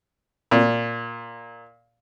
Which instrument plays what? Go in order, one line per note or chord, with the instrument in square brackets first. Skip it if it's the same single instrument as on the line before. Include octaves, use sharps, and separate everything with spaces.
[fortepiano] A#2